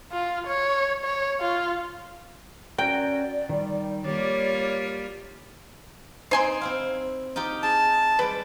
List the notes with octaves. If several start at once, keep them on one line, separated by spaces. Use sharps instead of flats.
F4
C#5
C#5
F4
C#4 F#4 A#4 D5 G5
D#3 G3
G3 A#3 F4 C#5 D5
C4 D#4 C5 G#5 C6
C4 E4 F5
D#4 F4 G4
G#4 A5
G3 G#3 B4 D5